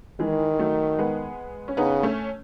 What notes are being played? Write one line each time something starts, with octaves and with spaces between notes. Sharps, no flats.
D#3 E3 G#3
F#3 A3
G#3 B3
C#4
C#3 B3 D#4
A3 C#4